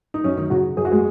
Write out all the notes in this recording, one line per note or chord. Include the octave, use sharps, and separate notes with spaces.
D#4
F#2 C#4
D#3 D#4
C#3 F#3 F#4
F#2 G#4
F#4
G#3 G#4